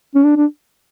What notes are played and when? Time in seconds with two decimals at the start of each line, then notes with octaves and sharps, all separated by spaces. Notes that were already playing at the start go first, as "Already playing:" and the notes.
0.15 C#4
0.24 D4
0.37 D4